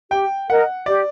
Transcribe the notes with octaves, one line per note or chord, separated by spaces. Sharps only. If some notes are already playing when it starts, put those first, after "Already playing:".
G4 G5
A#4 D#5 F#5
G4 D5